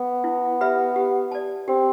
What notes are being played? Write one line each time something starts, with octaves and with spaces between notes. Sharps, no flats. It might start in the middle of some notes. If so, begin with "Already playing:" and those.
Already playing: B3
E4
G4 B4 E5 B5
G4
D5 A5
C4 G4